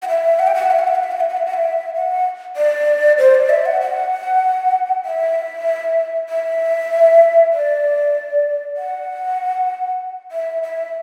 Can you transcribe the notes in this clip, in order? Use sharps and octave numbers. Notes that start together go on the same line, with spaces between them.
F#5
E5
F#5
G5
F#5
E5
F#5
E5
F#5
E5
F#5
E5
F#5
E5
F#5
E5
F#5
D5
C5
D5
E5
F#5
F#5
E5
E5
D5
F#5
E5
E5